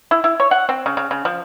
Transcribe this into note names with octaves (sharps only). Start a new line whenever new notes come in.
E4
E4
C#5
F#5
C4
C#3
C#3
C#3
F3